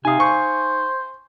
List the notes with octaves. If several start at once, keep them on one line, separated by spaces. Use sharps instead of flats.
C3 D#4 F5 G#5 D#6
C5 C#6